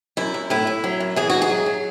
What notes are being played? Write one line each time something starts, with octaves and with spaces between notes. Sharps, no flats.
F#2 E4
F#2
A2 E4
A2
F#3
F#2
E3 G#4
G#2 F#4
G#4
F#3
F#3